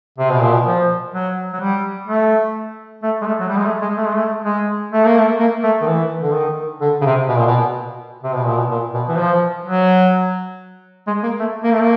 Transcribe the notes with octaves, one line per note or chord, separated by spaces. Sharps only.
C3
B2
A#2
B2
F3
F#3
F#3
G3
A3
A3
G#3
A3
F#3
G3
G#3
A3
G#3
A3
G#3
A3
G#3
A3
A#3
A3
A#3
A3
D#3
E3
D3
D#3
D3
C#3
C3
B2
A#2
B2
C3
B2
A#2
B2
A#2
B2
E3
F3
F#3
G#3
A#3
A3
A#3
A3
A#3